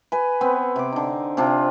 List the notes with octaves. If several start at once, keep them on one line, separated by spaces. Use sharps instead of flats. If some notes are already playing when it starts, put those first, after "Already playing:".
B4 G#5
B3 C4
C3 D6
D3 D#4
C3 C4 D4 F4